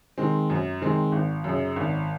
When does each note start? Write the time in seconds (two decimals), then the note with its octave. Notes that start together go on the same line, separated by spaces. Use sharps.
0.18 D#3 G#3 C4
0.50 F#2
0.81 D#3 G#3 C4
1.12 G#1
1.44 F#2 C#3
1.76 G#1